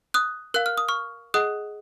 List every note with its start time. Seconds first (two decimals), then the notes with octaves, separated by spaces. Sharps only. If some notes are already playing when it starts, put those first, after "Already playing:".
0.14 D#6 F#6
0.54 A#4 F5 F#6
0.66 F6
0.78 D#6
0.88 C#6 F6
1.34 G#4 D#5 F#5 D#6 F#6